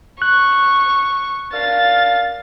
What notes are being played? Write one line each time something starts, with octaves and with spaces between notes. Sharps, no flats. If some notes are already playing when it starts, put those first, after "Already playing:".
C#6 F#6
D4 A#4 F5 A6